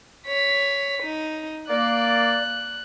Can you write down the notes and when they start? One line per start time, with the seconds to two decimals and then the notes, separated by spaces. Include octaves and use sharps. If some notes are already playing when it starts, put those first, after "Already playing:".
0.27 C#5 B6
1.03 D#4
1.70 A#3 D5 F#6